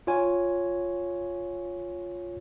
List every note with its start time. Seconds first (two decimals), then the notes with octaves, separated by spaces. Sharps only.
0.07 F4 C#5 G#5